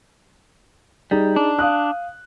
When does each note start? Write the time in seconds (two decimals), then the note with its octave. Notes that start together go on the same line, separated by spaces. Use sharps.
1.11 G3 D#4 G#4
1.36 D4
1.59 F5 D#6 F#6